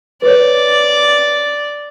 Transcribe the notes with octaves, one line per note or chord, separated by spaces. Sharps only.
B4 C#5 D5